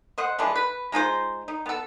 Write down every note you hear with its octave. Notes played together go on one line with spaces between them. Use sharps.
C5 D#5 F#5
E3 F3 G#3 D4
B4
G#3 D#4 F4 C5
D#4
B3 A4